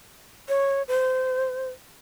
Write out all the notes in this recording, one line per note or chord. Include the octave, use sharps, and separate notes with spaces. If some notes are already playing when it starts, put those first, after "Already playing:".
C#5
C5